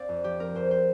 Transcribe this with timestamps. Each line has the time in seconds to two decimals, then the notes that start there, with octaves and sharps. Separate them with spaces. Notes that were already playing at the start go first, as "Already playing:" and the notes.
Already playing: C4 D5 F5
0.09 F2
0.24 F3 G4
0.39 C4 A#4
0.55 F2 C5
0.71 C5